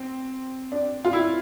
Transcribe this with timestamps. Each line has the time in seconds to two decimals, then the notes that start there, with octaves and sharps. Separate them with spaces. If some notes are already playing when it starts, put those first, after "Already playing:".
Already playing: C4
0.72 D4
1.05 F4
1.13 E4